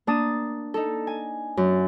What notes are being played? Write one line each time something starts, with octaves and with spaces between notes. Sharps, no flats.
A#3 D4 A5 D#6
D#4 A4
G#5
F#2